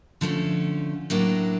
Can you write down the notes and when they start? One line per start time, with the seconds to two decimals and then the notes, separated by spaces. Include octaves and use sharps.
0.21 D3 F3 A3 C#4
1.10 A2 F#3 A#3 D4